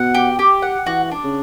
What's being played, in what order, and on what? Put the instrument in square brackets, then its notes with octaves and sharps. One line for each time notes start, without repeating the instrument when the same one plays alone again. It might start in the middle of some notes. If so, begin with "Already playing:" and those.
Already playing: [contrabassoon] B2 [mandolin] F#5
[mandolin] G4
G4
F#5
[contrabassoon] E3 [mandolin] F#4
[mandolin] D4
[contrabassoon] C#3